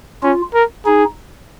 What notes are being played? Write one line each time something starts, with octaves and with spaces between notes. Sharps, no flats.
C#4 F4
A#4
D#4 G#4